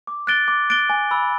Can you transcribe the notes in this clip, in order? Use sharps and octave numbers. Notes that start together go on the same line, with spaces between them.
D6
F#6 A6 D7 G7
D6
F#6 A6 D7 G7
G#5
B5 E6